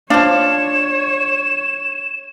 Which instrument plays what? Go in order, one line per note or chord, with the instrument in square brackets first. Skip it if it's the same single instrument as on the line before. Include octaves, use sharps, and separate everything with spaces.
[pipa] F3 F5 [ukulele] D4 [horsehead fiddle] C#5 [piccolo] E7